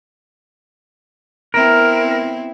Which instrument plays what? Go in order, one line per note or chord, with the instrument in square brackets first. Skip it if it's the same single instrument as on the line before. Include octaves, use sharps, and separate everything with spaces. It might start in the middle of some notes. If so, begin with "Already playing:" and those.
[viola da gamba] B3 C4 E4 [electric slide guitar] A#4